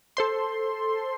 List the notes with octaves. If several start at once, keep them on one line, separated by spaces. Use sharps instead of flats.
A4 C5 C6